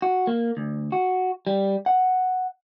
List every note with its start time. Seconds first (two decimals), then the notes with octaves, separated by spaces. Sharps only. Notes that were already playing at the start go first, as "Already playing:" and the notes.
0.02 F#4
0.27 A#3
0.57 D2
0.92 F#4
1.47 G3
1.86 F#5